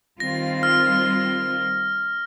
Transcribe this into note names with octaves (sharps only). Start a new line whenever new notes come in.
D#3 G3 C4 F4 A#6
F6